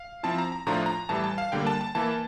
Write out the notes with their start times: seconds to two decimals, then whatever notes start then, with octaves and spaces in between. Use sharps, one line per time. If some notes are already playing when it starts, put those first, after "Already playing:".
Already playing: F5
0.23 F3 C4 E4 A5
0.38 A#5
0.52 A#5
0.66 A2 F3 A3 D4 F4 A#5
0.86 A#5
1.09 A2 E3 G3 A5
1.24 A5
1.38 F5
1.52 D3 G3 A#3 D4 G5
1.67 A5
1.81 A5
1.95 E3 A#3 E4 A5